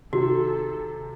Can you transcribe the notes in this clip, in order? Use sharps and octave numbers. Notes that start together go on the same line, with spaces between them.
C3 D#3 F#4 A4